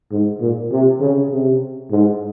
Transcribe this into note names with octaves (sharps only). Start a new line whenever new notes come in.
G#2
A#2
C3
C#3
C3
G#2